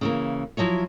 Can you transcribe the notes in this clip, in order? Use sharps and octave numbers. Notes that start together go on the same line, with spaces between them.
C#3 E3 A#3
F3 F#3 E4 C#5